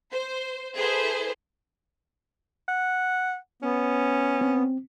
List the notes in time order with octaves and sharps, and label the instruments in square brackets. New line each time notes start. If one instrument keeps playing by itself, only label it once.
[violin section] C5
E4 G#4 A4 B4 C5
[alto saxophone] F#5
[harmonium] B3 [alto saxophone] C#4
[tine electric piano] C4